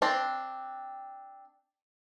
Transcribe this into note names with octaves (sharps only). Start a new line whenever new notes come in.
C4 D4 A5